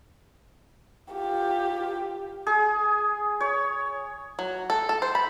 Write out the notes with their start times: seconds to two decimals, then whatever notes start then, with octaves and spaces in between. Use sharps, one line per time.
1.13 F4 G4
2.47 G#4
3.40 C#5
4.39 F#3
4.70 A4
4.89 A4
5.02 C5
5.15 B5